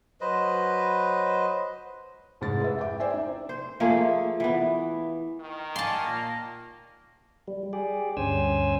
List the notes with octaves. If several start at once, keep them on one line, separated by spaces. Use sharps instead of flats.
F#3 B4 C5 D#5
F1 G#2 G#3 A6
B4 E5
G5 D6
C5 D5 E5 G#5
D#4
C5
F3 A3 A#3 G#4
E3 B3
D#3
F5 G#5 A5 C6 D6
A#2 A#3
G3
G4 G#4 D5
D2 G2 C#4 C5 G#5 E6